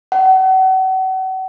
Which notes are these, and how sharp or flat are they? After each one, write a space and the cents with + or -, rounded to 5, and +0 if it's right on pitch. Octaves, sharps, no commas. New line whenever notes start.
F#5 +35